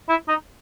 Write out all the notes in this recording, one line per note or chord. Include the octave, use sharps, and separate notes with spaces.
E4
D#4